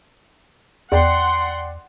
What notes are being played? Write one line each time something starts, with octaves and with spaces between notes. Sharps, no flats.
E2 D5 F#5 G5 C6